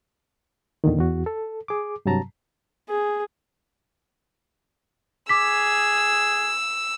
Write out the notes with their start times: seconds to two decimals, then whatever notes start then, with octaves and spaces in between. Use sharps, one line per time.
0.84 E2 A#2 D3 D#3
0.98 E2 F#4
1.26 A4
1.68 G#4 D6
2.06 G2 C3 F#3 A5 A#5
2.89 G#4
5.29 G#4 D6 E6 B6